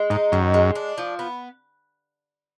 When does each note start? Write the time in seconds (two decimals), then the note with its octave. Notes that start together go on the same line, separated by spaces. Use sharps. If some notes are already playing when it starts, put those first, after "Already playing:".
Already playing: G#3
0.10 G#2 D#4
0.32 F#2 D#3
0.54 G#3
0.75 D4
0.98 F3
1.19 B3